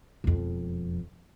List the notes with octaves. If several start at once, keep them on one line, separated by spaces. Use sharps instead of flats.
E1 F2